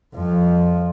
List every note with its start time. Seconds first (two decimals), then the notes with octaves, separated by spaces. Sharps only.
0.15 F2 F3